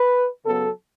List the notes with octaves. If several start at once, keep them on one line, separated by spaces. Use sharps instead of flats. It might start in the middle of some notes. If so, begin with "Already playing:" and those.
Already playing: B4
C#3 F#3 B3 A4